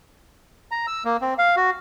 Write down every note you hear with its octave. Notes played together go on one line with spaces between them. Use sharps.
A#5
E6
A#3
C4
F5
F#4